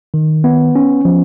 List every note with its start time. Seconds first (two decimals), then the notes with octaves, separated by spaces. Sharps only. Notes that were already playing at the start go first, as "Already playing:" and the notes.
0.14 D#3
0.44 B3
0.75 C#4
1.05 F3